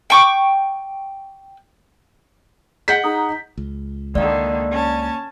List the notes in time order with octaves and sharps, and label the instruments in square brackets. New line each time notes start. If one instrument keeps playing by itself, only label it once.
[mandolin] G5 C#6 D6
[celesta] G#4 D#5 C7 [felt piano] F#5 G6 B6
[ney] D#4 [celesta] G#4 A#5 D#6
[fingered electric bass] C#2
[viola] D3 D#3 [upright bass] A#3 [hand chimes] D5 F5
[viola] C#4 A5